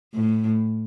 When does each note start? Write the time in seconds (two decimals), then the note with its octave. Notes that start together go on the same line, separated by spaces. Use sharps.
0.14 A2